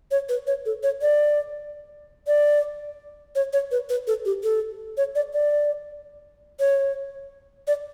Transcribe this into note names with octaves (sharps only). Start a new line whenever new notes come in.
C#5
B4
C#5
A4
C#5
D5
D5
C#5
C#5
B4
B4
A4
G4
A4
C#5
D5
D5
C#5
D5